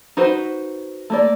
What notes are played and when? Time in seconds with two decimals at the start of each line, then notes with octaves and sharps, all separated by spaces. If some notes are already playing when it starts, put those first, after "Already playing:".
0.17 D#4 F#4 B4 C5
1.10 A3 A#3 D5